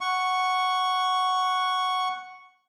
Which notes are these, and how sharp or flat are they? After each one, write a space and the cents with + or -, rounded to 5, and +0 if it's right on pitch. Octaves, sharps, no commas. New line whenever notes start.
F#5 +0 C#6 +0